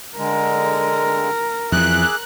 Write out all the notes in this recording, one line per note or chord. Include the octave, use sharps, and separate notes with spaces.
D3 G#3 A#4
F2 E3 G#4 E5 D6 F#6